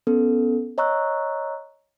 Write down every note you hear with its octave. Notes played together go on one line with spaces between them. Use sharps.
B3 C#4 A4
C#5 D#5 A#5 C#6 E6 F#6